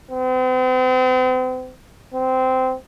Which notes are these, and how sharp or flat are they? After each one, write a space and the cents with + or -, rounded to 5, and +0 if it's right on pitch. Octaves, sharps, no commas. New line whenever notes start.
C4 -40
C4 -15